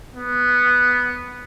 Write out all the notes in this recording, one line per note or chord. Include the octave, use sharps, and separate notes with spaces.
B3